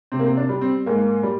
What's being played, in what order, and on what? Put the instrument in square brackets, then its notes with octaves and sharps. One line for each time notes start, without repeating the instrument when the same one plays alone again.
[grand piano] C3 C4
A#3
C4
D4
G3
C4
G#2 A#3
G3